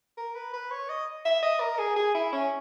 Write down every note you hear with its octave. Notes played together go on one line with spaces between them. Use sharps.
A#4
B4
B4
C#5
D#5
E5
D#5
A#4
G#4
G#4
E4
C#4